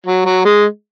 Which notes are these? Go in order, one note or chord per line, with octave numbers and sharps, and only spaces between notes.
F#3
F#3
G#3